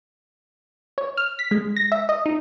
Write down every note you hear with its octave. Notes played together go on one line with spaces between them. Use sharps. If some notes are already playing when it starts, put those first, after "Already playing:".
C#5
F6
B6
G#3
A#6
E5
D#5
D#4